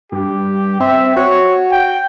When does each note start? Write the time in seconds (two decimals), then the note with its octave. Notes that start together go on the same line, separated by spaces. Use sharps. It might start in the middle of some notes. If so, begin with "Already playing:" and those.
0.12 G2 G4
0.80 C4 E5
1.17 F#4 C#5
1.72 G5